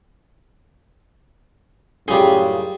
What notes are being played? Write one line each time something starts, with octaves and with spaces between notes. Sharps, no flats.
F#2 A2 C#3 G3 F4 G4 G#4